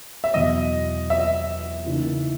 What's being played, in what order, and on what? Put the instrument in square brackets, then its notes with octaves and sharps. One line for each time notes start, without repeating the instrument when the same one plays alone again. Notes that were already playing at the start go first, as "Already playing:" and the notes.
[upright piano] E5
[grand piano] E2 B2 F#3 [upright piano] D#5
[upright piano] E5
[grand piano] C#3 E3 A#3 D#4